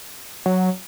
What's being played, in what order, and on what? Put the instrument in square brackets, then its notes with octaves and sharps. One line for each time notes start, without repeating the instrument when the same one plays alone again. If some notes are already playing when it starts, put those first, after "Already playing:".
[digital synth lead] F#3